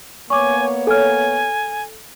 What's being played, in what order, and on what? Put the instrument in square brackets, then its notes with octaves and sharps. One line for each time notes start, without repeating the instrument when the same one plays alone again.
[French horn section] A#3 B3 C#5 [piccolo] G#5 [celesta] C#6 D6
[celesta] A4 F6 [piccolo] G#5